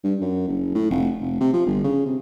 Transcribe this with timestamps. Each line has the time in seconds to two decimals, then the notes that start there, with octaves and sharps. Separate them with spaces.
0.04 G2
0.21 F#2
0.48 F#1
0.75 A2
0.90 F1
1.20 F1
1.41 C3
1.53 F3
1.67 G1
1.84 C#3
2.06 C3